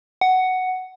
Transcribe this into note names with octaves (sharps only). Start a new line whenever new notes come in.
F#5